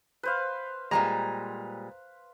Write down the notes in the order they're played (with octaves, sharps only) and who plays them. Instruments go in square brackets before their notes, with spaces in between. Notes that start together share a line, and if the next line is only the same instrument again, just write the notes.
[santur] B4 C5 F5
[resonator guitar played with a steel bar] A#2 G3 G#3 [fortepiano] A#5